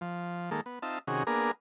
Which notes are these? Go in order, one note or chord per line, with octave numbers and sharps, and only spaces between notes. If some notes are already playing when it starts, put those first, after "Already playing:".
F3
D#3 G#3 A#3 A4
B3
C4 D#4 F4 E5 A5
C3 D#3 C#4 F#4 G#4
A#3 B3 D4 G#4 A#4